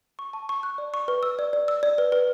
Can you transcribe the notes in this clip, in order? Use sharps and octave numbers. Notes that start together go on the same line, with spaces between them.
C#6
A5
C#6
F#6
D5
C#6
B4
E6
D5
D5
E6
D5
B4
B4